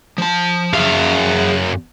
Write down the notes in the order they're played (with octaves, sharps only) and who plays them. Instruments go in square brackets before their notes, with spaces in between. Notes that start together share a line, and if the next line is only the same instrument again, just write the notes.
[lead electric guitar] F3 A5
[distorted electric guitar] F#2 F5 [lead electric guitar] G#4 E5